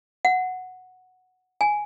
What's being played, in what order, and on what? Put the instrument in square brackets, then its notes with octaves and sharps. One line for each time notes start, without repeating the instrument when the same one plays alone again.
[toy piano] F#5
G#5